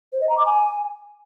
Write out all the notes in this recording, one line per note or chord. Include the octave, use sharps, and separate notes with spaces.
C5
D#5
A#5
D6
G#5